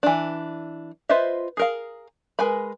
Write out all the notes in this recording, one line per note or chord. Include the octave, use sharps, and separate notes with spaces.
E3 D4
F4 B4 C5 D#5 E5
G#4 A#4 F5
G#3 A#4 B4 G#5 B5